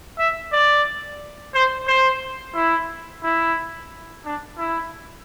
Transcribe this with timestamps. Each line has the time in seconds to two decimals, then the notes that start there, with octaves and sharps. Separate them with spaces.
0.19 E5
0.52 D5
1.55 C5
1.87 C5
2.55 E4
3.23 E4
4.25 D4
4.58 E4